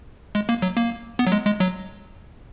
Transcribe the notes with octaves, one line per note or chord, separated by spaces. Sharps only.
G#3
A#3
F#3
A#3
B3
F#3
G#3
G#3
F#3